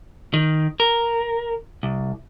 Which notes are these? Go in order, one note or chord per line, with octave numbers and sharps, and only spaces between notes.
D#3
A#4
C2